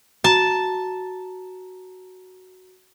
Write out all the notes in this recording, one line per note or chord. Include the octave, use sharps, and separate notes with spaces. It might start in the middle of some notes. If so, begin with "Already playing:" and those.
F#4 A5 A#5